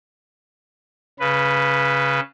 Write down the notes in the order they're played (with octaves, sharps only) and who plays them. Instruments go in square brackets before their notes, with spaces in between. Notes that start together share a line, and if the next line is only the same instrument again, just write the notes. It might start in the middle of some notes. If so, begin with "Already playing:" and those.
[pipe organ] C#3 B4